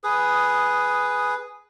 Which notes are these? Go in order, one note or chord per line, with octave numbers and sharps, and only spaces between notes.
G#4 B4 D#6